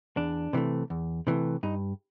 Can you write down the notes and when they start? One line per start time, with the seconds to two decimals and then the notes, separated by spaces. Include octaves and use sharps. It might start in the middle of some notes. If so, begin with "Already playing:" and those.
0.17 E2 D4
0.53 C3 E3 A3
0.90 E2
1.27 C3 E3 A3
1.63 G2 D#4